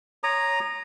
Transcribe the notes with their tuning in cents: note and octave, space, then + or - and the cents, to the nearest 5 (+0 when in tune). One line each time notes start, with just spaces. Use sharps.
C#5 +0 A#5 +0 D#6 -30